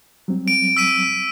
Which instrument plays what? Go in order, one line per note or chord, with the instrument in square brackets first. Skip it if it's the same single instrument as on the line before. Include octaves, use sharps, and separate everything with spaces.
[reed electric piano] F#3 G3 C4
[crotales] D7
E6 B6 D#7